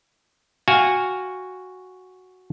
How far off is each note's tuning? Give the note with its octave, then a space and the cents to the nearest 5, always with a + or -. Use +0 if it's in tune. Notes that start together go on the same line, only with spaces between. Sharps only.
F#4 +0 F5 +0 G#5 -20